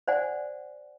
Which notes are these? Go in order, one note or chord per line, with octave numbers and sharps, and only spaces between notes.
C5 D5 F#5 G#5